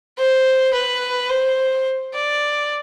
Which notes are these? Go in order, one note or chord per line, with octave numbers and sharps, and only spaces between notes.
C5
B4
C5
D5